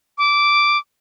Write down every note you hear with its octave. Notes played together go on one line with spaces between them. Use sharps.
D6